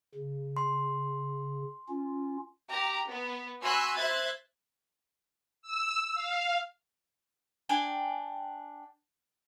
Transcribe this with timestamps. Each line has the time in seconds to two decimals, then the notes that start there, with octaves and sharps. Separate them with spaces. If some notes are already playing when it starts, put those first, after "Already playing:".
0.15 C#3
0.57 C6
1.88 C#4 F4
2.68 G4 A#5
3.08 B3
3.61 F#4 G#5 B5 C6 E6 F#6
3.95 C5 E5 F#6 G#6 A6
5.62 E6
6.15 F5
7.69 D4 G5 G#5